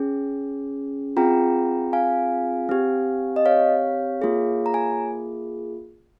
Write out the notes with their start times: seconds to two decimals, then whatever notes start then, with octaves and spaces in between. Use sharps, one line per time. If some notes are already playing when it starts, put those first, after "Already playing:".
Already playing: C#4 G#4
1.17 C4 F4 G#4 G5 A#5
1.93 F5 G#5
2.69 C4 G4
3.36 D#5
3.46 C#5 F5
4.22 A#3 F4 G#4
4.66 A#5
4.74 G#5